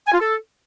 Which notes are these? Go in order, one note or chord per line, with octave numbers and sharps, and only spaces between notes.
G#5
F4
A4